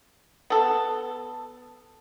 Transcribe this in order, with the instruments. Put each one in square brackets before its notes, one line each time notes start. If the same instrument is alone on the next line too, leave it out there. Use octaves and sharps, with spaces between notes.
[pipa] B3 A4